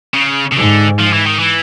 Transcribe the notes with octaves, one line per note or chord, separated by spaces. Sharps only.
C#3
C#3
G#2 D3
F3
E3
D#3
E3